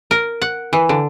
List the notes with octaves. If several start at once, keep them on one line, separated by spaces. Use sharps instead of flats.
A#4
F#5
E3
D3